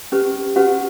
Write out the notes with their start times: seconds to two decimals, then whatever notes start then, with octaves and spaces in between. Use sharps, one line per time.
0.12 C#4 G4 B4
0.56 C#4 F#4 G4 B4 F#5